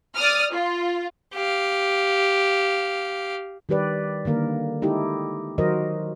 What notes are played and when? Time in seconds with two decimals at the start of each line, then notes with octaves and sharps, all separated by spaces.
0.15 D5 D#6 F6
0.52 F4
1.34 G4 F5
3.69 D#3 G3 G4 B4 D5
4.25 D3 D#3 A#3 A#4
4.82 G#3 D#4 E4 G4 A4
5.58 D#3 F#3 F#4 A#4 C5 D#5